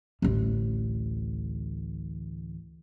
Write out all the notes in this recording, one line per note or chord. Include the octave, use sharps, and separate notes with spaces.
A1 D2